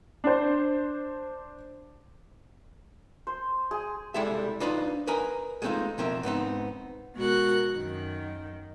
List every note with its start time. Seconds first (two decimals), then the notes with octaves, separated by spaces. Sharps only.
0.24 D4 C5
3.27 C5
3.71 G#4
4.14 C2 G3 G#3 E4 A4 E5
4.60 D4 D#4 F4 B4 C5 D#5
5.07 A#4 B4 D#5 G#5 A#5
5.62 G#3 A3 C4 C#4 D#4 F4
5.98 B2 F3 C4 A#4 E5
6.23 G#2 B3 C4 D#4
7.16 B2 G#3 F#4 A#4 F#6
7.74 F#2 D#3